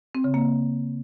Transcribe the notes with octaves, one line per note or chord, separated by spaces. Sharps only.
C4
C#3
A#3